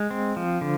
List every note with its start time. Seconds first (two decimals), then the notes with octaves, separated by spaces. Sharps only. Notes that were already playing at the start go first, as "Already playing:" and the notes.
Already playing: G#3
0.11 C4
0.36 F3
0.61 D3